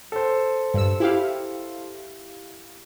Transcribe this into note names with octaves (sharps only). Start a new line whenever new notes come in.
A4 C5
G2 E6
E4 G4 F5